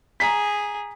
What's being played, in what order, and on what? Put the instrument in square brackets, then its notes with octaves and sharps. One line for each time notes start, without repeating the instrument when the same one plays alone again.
[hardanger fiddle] G#4 [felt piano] A#5 B6